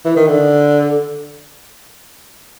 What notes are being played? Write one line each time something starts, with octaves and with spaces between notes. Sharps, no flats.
E3
D#3
D3